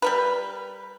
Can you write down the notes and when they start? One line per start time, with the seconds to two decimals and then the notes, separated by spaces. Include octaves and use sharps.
0.02 G3 A#4 B4